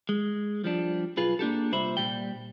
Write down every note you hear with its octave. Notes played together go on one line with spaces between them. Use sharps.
G#3
F3 G3 D4
B1 F4 G#4 B4
A#3 D4 G4 A4
C2 A#2 C5 E5 B5
A#2 G3 G5